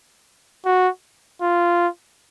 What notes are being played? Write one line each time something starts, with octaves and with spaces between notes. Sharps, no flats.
F#4
F4